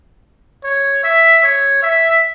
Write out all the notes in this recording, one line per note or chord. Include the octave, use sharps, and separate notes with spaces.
C#5
E5
C#5
E5